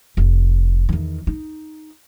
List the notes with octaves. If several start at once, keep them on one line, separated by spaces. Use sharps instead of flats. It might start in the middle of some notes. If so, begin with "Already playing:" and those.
F1
E2 D#3
D#4